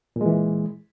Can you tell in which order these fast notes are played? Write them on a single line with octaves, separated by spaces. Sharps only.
A#2 G#3 E3